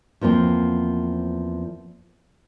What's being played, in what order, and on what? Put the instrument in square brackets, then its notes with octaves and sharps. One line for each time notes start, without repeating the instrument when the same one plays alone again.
[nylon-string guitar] E2 F3 A#3 C4